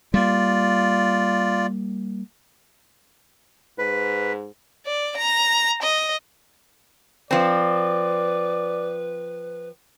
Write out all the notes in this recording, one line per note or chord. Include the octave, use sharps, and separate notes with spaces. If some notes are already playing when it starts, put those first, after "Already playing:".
G3 A#3 F4 D5
G#2 B4
D5
A#5
D#5
F3 C4 B4 D5